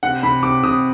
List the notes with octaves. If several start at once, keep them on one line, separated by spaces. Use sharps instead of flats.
C3 F#5
C3 B5
C3 D6
C3 D#6